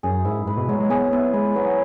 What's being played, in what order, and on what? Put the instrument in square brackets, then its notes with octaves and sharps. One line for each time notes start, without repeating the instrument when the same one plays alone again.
[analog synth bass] F#2 [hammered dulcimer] G#4
[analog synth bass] G#2 [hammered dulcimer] E4
[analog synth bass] G#2 [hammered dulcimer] B4
[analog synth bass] B2
[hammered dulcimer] F#3 [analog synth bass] G#3
[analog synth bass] G#3
[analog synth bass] B3 [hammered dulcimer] G#4
[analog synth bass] B3 [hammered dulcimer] E4
[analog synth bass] G#3 [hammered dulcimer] B4
[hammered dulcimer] F#3 [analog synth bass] B3